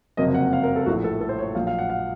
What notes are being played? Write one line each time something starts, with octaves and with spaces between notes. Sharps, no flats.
F#1 F2 C3 F#3 A#3 D#5
F#5
F5
A#4
A4
A#1 A2 F3 A3 F#4
A4
A4
C5
C#5
A#1 A#2 F#3 F5
F5
F#5
F5